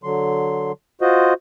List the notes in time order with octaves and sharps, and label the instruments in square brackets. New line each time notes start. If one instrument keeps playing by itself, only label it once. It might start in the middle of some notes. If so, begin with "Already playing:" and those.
[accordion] D3 F#3 C6
F4 F#4 C5 D#5